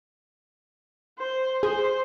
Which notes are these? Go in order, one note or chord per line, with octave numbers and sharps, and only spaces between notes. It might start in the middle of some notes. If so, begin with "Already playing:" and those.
C5
G#4 C5